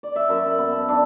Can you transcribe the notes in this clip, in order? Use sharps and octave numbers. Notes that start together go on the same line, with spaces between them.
D5
E5
F#2
B5
B3
A5
D4